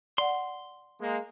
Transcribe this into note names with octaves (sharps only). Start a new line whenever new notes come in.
D5 F#5 C6
G#3 A#3